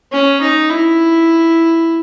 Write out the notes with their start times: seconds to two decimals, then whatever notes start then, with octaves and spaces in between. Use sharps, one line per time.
0.12 C#4
0.41 D#4
0.70 E4